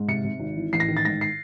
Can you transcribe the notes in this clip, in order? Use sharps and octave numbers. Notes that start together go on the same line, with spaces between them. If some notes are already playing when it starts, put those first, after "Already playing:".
Already playing: G#2
C3 C#7
C3
G#1
E3
A1 C7
A#6
D#3
A6
G#2 A#6
C7